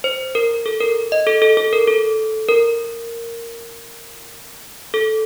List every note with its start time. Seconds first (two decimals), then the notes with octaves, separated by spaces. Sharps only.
0.04 C5
0.35 A#4
0.66 A4
0.81 A#4
1.12 D#5
1.27 A4
1.42 A4
1.57 A4
1.73 A#4
1.87 A4
2.49 A#4
4.94 A4